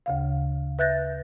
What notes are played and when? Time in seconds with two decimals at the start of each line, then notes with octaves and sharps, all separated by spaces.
0.06 D2 C#3 F5
0.79 B4 E5 F#6 G6 A6 A#6